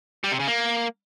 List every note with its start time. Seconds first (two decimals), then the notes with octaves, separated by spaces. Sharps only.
0.24 G3
0.32 C3
0.39 C#3
0.47 A#3